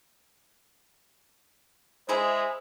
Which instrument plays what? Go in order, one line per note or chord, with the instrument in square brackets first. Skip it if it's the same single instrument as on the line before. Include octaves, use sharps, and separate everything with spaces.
[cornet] G#3 [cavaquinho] E4 G#4 E5 [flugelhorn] C5